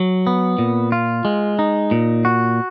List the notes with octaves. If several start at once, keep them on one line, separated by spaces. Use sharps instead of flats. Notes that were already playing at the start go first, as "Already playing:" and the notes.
Already playing: F#3
B3
A#2
F4
G#3
D#4
A#2
F#4